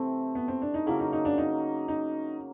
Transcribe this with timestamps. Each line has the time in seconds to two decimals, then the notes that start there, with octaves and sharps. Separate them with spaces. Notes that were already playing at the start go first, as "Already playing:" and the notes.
Already playing: C3 E3 A3 C4
0.35 B3
0.48 C4
0.62 D4
0.74 D#4
0.86 C#3 F#3 A#3 E4
1.00 D#4
1.13 D#4
1.25 D4
1.38 D#4
1.88 D#4